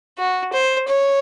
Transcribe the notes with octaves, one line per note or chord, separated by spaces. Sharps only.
F#4
C5
C#5